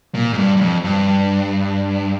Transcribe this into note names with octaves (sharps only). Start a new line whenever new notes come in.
A#2
G#2
G2
G2
F2
G2